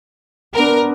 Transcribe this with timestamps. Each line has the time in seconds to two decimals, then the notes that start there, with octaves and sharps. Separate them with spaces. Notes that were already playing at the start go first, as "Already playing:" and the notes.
0.54 B3 D4 A#4